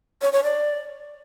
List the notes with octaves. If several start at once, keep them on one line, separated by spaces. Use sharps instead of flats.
C#5
C#5
D5